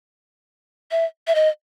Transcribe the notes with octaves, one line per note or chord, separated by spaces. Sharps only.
E5
E5
D#5